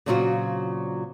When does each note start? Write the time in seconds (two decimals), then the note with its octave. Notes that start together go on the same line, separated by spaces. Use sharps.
0.06 A#2 C#3 F#3 C4 F4 F#4